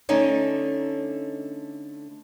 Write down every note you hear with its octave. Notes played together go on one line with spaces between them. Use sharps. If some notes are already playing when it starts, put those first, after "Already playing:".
D3 A3 C#4 D#4